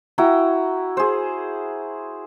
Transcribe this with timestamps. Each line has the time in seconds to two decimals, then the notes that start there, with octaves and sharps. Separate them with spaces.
0.18 E4 F#4 G5 A#5
0.97 G#4 C5